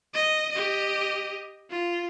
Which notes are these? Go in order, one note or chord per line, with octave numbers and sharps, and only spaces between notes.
D#5
G4 D#5
F4